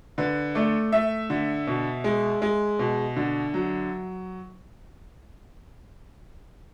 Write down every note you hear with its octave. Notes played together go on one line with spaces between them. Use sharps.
D3 B4
A3 D5
A3 E5
D3
B2
G#3
G#3
B2
D3
F#3